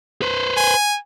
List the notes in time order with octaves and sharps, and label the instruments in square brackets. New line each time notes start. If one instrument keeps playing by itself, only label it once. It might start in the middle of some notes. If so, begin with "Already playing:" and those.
[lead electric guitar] B4 C5
[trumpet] G#5